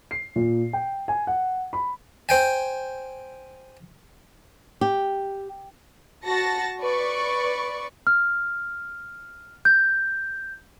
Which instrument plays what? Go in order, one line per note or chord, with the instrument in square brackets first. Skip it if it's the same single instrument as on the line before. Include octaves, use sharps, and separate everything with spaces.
[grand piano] C7
A#2
G5
G#5
F#5
B5
[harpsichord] C5 G5 G#5
[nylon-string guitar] G4
[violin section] F#4 A5 A6 A#6 C#7
B4 D5 C#6
[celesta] F6
G6